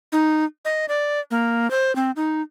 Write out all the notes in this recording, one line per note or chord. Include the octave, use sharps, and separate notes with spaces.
D#4
D#5
D5
A#3
C5
C4
D#4